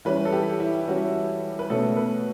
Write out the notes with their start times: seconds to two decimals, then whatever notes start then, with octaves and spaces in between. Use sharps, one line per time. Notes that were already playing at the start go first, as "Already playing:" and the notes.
0.05 E3 G3 C#4 B4
0.25 A4
0.32 G4
0.60 E4
0.88 E3 G3 C#4 F#4
1.59 B4
1.70 B2 A3 C#4 A4
1.97 B4